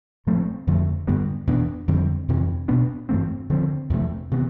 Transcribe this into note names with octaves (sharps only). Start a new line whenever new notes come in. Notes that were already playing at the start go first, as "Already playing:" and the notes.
A2 F3 A3 C4
F2 D3 F3 A3
G2 D3 G3 B3
E2 B2 B3 D4
F2 D3 G3 C4
F2 C3 E3
B2 B3 D4
G2 E3 A3 C4
D3 F3 C4
E2 C3 F3 A3
C3 E3 B3